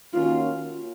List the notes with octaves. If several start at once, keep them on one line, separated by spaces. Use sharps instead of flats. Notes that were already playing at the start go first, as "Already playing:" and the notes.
D#3 A#3 C#4 F4 F#4